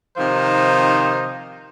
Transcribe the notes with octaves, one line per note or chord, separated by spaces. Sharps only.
C3 D#3 F3 D#4 C5